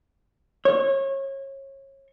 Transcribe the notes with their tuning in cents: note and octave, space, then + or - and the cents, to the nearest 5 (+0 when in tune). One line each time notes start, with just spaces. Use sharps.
C#5 -30